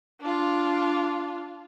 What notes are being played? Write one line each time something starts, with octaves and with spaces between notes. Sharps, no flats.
D4 F4